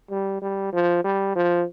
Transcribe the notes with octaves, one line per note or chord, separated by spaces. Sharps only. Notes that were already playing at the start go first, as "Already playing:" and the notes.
G3
G3
F3
G3
F3